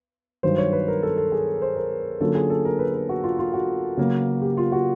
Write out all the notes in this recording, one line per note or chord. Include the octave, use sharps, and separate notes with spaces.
G2 D#3 F#3 C5
C#5
B4
A#4
A4
A4
G#4
C5
A#4
D3 F#3 A#3 C#4 F4 A4
G#4
A4
A#4
B4
B4
F#4
F4
F4
F#4
C#3 F#3 A#3
G4
F4
F#4